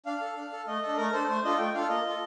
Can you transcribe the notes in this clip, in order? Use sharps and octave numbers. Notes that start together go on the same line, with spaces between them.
D4 F5
A4
D4
A4
A3 D#5
D4 A4
A3 A#4
D4 A4 C5
A3 C5
D4 F4 A4 D#5
A3 G5
D4 F4 A4 F5
A#3 D#5
F4 A4